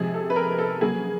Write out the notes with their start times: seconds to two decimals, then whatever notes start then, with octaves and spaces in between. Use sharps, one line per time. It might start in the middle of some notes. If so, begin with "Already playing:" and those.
Already playing: C3 F3 G#3 G#4
0.14 A4
0.30 B4
0.36 A#4
0.59 A4
0.81 C#3 F#3 A#3 G#4